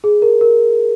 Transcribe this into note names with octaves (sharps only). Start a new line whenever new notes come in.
G#4
A#4
A#4